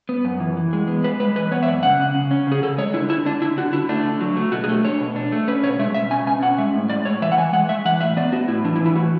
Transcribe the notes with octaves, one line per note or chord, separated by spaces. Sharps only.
B3
F#2
E3
E3
G#3
B3
G#3 B4
G#3 B4
E3 B4
B3 C#5
E5
F#2 D5
C#3 F#5
C#3
C#3
C#4
C#3 G#4
C#3 A4
G#3 C#5
D3 E4
D3 E4
D3 D4
D3 E4
D3 F#4
D3 E4
A3 D4
D3
F#3
A3
B2 F#4
G#4
A3 A4
D4 C#5
B2
D4
A3
C#4 B4
B2 C#5
G#3 E5
B2 E5
C#4 G#5
B2 G#5
C#4 F#5
G#3 E5
A2
G#3 D5
A2 C#5
E3 E5
F#5
E3 G#5
G#3 F#5
G#3 E5
E3 F#5
A2 E5
B3 D5
B3 F#4
A2 E4
E3 D4
E4
E3
E4
A2 F#4